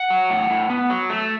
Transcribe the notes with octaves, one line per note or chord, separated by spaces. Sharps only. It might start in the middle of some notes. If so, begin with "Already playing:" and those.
Already playing: F#5
F#3
A2
A2
B3
F#3
A3